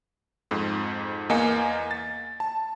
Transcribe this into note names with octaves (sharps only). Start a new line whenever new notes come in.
F2 G#2
E2 A#3 D#5 F5 G#5 C#7
A6
A5